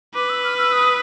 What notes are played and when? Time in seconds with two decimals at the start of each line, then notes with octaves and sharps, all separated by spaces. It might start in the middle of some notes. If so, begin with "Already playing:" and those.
0.14 B4 D6
0.29 E6
0.44 F6
0.58 E6
0.72 D#6